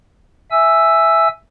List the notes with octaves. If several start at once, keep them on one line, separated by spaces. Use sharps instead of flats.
E5 G#5 E6